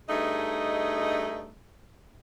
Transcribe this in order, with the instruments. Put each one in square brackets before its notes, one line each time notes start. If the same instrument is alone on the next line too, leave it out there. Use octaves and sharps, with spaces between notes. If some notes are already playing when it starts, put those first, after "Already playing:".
[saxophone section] G2 A3 D#4 G#4 D#5